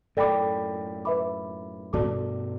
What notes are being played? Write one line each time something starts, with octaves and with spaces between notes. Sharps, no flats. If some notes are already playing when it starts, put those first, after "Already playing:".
F#2 A2 A4 D5 G5 B5 D6
B4 E5 B5 D6
G2 B2 F#4 A4 D5 A5 D6